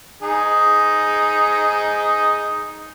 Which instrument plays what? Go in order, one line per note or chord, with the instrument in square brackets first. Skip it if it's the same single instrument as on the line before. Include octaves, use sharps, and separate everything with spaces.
[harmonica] D#4 G#4